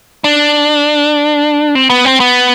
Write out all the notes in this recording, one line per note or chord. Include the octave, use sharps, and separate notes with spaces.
D4
C4
B3
C4
B3